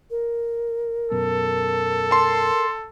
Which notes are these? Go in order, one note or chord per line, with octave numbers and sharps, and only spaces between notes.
A#4
F#2 B2 A4
A5 C6